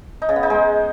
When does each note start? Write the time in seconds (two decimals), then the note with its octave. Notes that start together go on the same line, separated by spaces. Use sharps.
0.22 D#4
0.29 C#3
0.36 B3
0.43 D#4
0.50 G#3